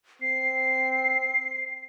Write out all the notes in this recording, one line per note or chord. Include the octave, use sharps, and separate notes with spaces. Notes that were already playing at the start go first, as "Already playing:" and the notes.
C4 C7